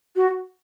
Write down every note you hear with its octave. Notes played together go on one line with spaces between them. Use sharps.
F#4